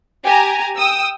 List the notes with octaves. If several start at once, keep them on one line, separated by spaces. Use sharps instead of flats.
G4 G#5 A#5
G5 D#6 E6